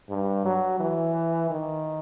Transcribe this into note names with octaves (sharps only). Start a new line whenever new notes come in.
G2
F#3
E3
D#3